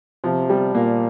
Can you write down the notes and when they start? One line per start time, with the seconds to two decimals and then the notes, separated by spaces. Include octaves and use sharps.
0.24 C3 F3
0.50 G3
0.75 A#2 A#3